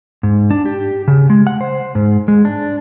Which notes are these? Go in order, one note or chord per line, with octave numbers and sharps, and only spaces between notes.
G#2
D4
G4
C#3
G#3
F#5
C5
G#2
G#3
D4